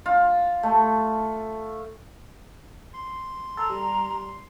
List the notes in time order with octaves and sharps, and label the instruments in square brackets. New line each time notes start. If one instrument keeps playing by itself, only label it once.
[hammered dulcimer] F4
A3
[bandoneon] C6
[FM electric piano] A4 [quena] A#5
[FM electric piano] G3